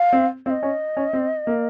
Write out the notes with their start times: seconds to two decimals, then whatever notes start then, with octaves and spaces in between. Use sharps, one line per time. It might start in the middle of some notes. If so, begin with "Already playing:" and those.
Already playing: F5
0.13 C4
0.46 C4 F5
0.50 D#5
0.63 C#4
0.97 C#4
1.13 C4
1.47 A#3